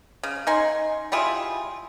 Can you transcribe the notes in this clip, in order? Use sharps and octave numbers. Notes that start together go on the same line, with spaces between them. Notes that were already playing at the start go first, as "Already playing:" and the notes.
C#3
D#4 G#5 C6
G3 E4 F4 G#4